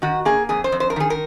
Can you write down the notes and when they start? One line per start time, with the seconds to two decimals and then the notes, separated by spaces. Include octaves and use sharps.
0.02 D#3 F#4
0.25 A#3 G#4
0.49 F2 G#4
0.64 C5
0.72 F2
0.80 C5
0.90 A#4
0.96 D#3 G#4
1.10 A#4